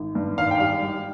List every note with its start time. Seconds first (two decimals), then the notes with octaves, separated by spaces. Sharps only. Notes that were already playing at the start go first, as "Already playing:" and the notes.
Already playing: G#1
0.15 G2
0.38 G#1 F5
0.51 G5
0.60 G3 F5
0.83 G3